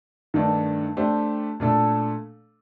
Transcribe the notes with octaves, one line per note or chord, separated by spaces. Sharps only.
G2 D#3 A3 D4
A3 D4 G4 C5
A#2 A3 D4 A4